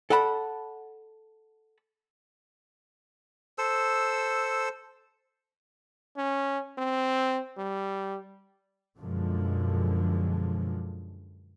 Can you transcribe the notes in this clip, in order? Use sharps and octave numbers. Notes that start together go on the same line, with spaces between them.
A4 D5 F#5 A5 B5
A4 C5 E6
C#4
C4
G3
F#2 B2 D3 F3 G#3